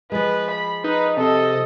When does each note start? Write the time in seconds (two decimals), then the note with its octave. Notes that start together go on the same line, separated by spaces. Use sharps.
0.12 F3 G#3 B4
0.51 B5
0.84 D#4 B4
1.17 C3 A4 D#5